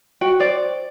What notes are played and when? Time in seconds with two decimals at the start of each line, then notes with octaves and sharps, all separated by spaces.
0.21 F#4 G5
0.40 C5 D5